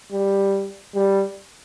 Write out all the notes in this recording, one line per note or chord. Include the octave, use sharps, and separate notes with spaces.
G3
G3